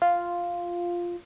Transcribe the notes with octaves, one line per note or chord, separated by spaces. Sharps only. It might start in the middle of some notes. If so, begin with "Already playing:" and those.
F4